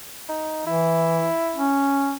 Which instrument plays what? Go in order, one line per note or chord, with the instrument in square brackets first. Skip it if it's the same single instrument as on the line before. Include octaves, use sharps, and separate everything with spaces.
[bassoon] D#4
[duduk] E3 [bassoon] E4
[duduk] C#4